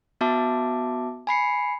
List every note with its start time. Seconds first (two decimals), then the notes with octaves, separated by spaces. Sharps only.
0.21 B3 F#4 E5 A5 D6
1.27 G#5 B5 C7 C#7